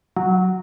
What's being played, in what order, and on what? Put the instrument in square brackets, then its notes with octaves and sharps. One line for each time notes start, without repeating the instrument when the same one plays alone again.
[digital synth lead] F#3